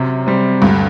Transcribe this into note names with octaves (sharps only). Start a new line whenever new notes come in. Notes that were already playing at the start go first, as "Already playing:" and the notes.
Already playing: F#2 C3
G3 C4
D2 G2